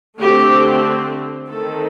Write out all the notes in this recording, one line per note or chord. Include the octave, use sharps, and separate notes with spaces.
D3 A3 C4 G4
D#3 A3 C4 A4